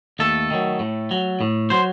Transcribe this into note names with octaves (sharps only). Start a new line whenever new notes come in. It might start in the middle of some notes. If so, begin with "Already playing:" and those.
D#2 A3 A4
D#3 F#3
A2
F#3
A2
F#3 C5